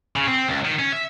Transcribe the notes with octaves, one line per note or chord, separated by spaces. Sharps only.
C#3
C4
C#2
D#3
C#4
E5